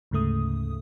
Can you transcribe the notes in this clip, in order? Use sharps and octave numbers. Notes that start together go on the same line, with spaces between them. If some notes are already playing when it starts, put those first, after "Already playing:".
D2 G#2 C#3 A3 D#6